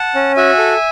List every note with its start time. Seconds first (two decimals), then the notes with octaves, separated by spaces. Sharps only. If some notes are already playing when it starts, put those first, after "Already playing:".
Already playing: F#5 A5
0.15 C#4
0.36 F#4 E5 G#5
0.59 A4